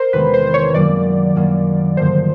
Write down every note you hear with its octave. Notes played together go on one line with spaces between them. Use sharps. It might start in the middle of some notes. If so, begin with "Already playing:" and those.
Already playing: A#4 C5
E2 C3 D#3 G#3 B3 B4
C5
C5
C#5
F#2 D#3 F#3 A#3 D5
F#2 D#3 F#3 A#3
G2 D3 F3 A#3 D#4 C5